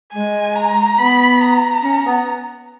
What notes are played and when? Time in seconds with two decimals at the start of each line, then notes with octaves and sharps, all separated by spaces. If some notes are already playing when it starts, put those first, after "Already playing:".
0.14 G#3 G#5
0.56 A#5
0.98 B3 B5
1.41 A#5
1.83 C#4
2.05 B3